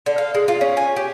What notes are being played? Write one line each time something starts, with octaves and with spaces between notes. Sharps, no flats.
D3
F5
G#3
F4
C#4
G#5
G4